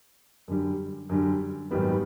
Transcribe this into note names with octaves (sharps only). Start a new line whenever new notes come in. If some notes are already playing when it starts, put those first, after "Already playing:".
F#2 D3 G3
F#2 D3 G3
G#1 F#2 D#3 G3 B3